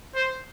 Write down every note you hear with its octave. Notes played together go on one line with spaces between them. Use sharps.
C5